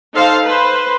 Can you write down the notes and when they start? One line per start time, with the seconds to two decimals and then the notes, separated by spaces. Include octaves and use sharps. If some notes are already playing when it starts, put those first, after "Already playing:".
0.13 D#4 A4 C5 F5
0.44 B4 C5